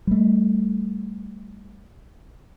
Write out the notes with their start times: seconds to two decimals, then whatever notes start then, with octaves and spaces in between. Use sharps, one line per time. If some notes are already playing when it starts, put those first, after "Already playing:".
0.07 G3 A3